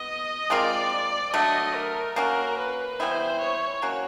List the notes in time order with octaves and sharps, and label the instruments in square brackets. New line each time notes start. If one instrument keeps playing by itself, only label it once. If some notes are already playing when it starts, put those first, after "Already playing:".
Already playing: [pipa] B3 [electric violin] D#5
[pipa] G#3 C4 F4 A#4 [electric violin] D5
[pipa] D3 F#3 A3 [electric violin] D#5
[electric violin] A#4
[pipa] A#3 C#4 F#4 [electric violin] A#4
[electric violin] B4
[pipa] E3 G3 B3 E4 [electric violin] C5
[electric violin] C#5
[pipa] F#3 A#3 C#4 F#4